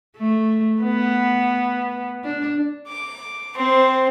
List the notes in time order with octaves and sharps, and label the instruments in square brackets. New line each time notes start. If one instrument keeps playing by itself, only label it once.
[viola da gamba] A3
B3
D4
[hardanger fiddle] D6
C4 C5